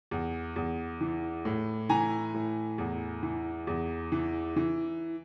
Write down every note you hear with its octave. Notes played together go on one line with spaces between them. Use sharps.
E2
E2
E3
A2
E3 G#5 A#5
A2
E2
E3
E2
E3
E3